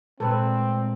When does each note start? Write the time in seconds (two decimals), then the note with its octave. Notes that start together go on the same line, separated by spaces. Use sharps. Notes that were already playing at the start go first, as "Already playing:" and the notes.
0.20 A#2 G#3 A3 C4 A4 B4 D5